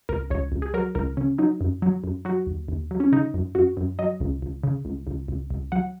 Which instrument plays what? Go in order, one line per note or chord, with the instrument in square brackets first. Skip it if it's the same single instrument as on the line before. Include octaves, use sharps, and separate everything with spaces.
[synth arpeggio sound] C#2 A#4
C#2 C#5
C#2
G#4
F#3 A#4
C#2 A#4
C#3 C#4
F#3 D#4
F#2
F#3
F#2
F#3 F#4
D#2
D#2
F#3
C#4
C#3 D#4
F#2
F#2 F#4
F#2
F#3 D#5
C#2
C#2
C#3
C#2
C#2
C#2
C#2
F#3 F#5